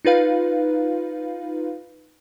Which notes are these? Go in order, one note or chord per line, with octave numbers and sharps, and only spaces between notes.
D#4 F4 B4 F5